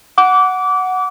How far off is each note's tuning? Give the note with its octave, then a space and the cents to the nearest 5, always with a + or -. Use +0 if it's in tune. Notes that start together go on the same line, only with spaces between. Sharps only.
F#5 +0 D6 -25